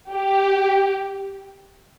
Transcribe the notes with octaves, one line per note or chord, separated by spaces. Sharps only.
G4